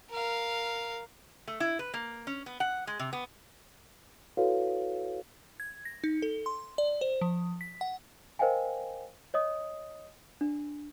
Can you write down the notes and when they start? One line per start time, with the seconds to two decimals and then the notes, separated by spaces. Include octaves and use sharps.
0.11 A#4 F5
1.48 A3
1.60 E4
1.79 B4
1.94 A#3
2.27 C#4
2.46 B3
2.60 F#5
2.87 G#3
2.99 C3
3.13 B3
4.37 E4 F#4 A4 B4 C#5 F5
5.60 G#6
5.85 A#6
6.04 D#4
6.22 A4
6.46 C6
6.78 D5
7.01 C5
7.21 F3
7.61 B6
7.81 F#5
8.39 A#4 C5 D#5 F5 G5 G#5
9.34 C#5 D#5 D#6
10.41 D4